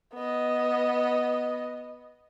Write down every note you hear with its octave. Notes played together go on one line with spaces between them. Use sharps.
B3 D#5